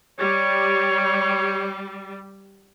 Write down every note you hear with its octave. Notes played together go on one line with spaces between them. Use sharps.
G3 C#5